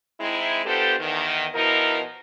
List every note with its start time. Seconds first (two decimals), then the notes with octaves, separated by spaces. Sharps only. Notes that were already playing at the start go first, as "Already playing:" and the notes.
0.20 G#3 C4 D#4 E4
0.66 B3 D4 F4 G4 A4 C5
1.00 E2 D#3
1.54 B2 F3 D#4 E4 A#4